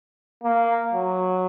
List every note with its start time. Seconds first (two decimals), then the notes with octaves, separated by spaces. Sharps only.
0.44 A#3
0.93 F#3